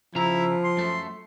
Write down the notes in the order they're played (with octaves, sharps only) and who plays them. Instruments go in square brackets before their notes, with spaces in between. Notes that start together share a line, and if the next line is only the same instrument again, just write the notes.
[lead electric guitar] C#3 A#5 [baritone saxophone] F3 [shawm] E4
[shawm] C6
[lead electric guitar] F#2 A3